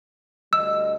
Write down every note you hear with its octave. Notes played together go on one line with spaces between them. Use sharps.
D2 G3 D#5 E6